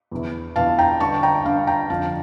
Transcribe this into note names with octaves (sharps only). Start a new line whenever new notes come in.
E2 E3
E2 E3 F5 A5
G5 A#5
G2 D3 A5 C#6
G5 A#5
G2 D3 F5 A5
G5 A#5
F2 D3 F5 A5